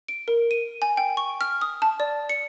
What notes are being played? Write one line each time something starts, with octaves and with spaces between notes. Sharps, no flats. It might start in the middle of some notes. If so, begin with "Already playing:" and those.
D7
A#4
D#7
G#5
G5
C#6
F6
D#6
A5
D5
C#7